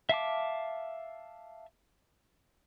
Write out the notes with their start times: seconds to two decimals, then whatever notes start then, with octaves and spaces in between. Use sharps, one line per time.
0.09 E5 F5 A5 D6